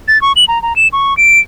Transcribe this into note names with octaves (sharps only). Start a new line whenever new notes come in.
A6
C#6
F#7
A#5
A#5
E7
C#6
D7